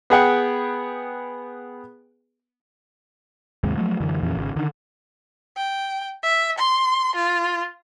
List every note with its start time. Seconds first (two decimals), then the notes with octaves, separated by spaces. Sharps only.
0.10 B3 G#4 F#5 G5
3.64 D#2 G#2 C3 G#3
3.77 F3 F#3 A3
4.00 F#2 D3 E3
4.23 F2 A#2 E3 C#4
4.35 G#1 C#3
4.56 D3 D#3
5.57 G5
6.23 E5
6.59 C6
7.16 F4